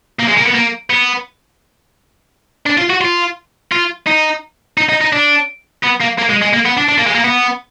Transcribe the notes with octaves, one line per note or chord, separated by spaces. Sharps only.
A#3
G#3
A#3
B3
A#3
B3
D4
F4
F#4
F4
F4
D#4
D#4
D#4
D#4
D4
B3
A#3
A#3
G#3
G#3
A#3
B3
D4
D4
A#3
G#3
A#3
B3